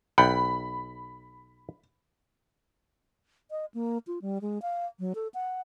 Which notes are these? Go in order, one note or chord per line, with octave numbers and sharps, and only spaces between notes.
B1 F#5 G5 B5
D#5
A#3
F4
G3
G#3
F5
F#3
A4
F#5